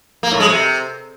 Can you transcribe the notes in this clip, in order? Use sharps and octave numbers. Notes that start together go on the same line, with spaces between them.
A#3
A2
G#3
C3